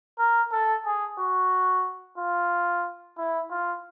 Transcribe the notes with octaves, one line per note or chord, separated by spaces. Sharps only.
A#4
A4
G#4
F#4
F4
E4
F4